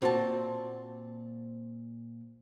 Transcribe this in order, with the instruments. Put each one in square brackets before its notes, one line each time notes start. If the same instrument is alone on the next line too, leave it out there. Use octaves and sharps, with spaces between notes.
[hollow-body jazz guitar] A#2 C4 F#4 C5 A5